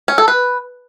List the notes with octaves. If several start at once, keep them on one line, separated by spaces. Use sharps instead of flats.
C#4
A4
B4